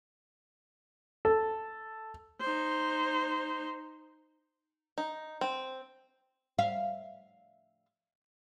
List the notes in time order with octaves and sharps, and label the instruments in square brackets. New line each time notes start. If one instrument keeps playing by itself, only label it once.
[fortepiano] A4
[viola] D#4 C5
[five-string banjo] D#4
C4
[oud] E5 F5